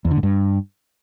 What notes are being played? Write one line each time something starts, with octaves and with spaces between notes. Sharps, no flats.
E2
D3
G#2
G2